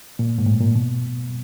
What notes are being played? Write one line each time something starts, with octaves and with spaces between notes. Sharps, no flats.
A#2
G#2
A2
A#2
B2